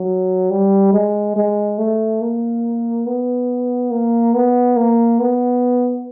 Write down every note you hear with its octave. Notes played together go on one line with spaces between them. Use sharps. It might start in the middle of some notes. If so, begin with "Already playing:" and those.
Already playing: F#3
G3
G#3
G#3
A3
A#3
B3
A#3
B3
A#3
B3